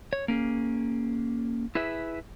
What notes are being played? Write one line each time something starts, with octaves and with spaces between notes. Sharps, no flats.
C#5
A#3 C#4 G#4
E4 G#4 B4 E5